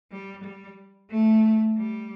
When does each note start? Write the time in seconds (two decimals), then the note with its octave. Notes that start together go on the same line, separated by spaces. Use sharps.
0.11 G3
0.44 G3
1.10 A3
1.78 G3